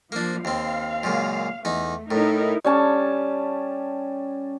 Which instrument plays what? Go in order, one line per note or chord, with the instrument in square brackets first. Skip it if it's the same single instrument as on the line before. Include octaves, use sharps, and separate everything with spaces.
[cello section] F3 [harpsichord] A#3 D4
[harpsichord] D#2 C4 [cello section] F5
[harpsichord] C#2 F#2 A#2
[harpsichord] E2 D#4 [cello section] A3
[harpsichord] A2 [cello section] D#4 E4 A#4
[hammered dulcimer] G3 C#4 A5